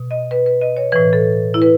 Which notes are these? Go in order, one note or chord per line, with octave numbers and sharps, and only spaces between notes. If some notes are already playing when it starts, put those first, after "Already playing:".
Already playing: B2
D#5
B4
B4
D#5
C#5
A2 E3 B4
A4
E4
B4